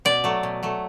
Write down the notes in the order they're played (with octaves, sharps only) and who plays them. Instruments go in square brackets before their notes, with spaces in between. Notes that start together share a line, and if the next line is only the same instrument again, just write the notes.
[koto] B2 D5
F#3 A3
B2
F#3 A3